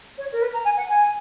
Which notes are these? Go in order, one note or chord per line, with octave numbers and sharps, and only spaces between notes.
C#5
A#4
B4
A#5
G#5
F#5
G#5